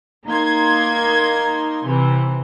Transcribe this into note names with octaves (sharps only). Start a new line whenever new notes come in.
A#3 D#4 C6 G#6
C3 E3 C4